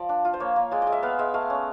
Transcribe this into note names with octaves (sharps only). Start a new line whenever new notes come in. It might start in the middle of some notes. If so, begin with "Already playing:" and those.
Already playing: F3 D5
D4
F4
C5
A#3 C#5
A#3
G#3 D5
G#3 D#5
E5
B3 F5
G#3 E5
A3 F5
C#4